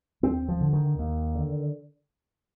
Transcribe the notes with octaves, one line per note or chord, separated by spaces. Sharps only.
D#2 C4
F3
D3
D#3
D#2
D3